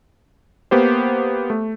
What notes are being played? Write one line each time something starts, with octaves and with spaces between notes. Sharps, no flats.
A#3 B3 G4 C5
A3